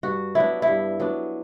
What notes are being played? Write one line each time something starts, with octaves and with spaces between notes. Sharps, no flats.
G2 F#4
F#3 B3 D4 E4
E4
G2
F#3 B3 D4